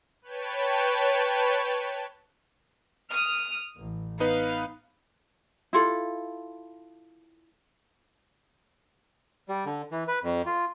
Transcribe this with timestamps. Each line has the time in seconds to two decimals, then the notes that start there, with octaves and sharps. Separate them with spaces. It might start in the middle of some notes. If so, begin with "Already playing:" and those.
0.22 B4 C#5 G5 A5
3.11 D#6 F6
3.77 A1
4.20 B3 D#4 B4 F5
5.73 E4 F4 A4
9.49 G3
9.66 D3
9.92 E3
10.08 B4
10.23 F2
10.46 F4